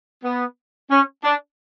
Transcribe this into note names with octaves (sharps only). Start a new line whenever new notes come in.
B3
C#4
D4